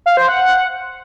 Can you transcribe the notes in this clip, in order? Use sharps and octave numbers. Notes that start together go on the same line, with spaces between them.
F5
C5
F#5